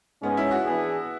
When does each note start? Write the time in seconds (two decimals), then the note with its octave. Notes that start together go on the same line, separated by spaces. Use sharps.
0.23 G#2 G#3 B3 C#4
0.37 E4
0.51 F#4
0.65 E3 B3 D4 G#4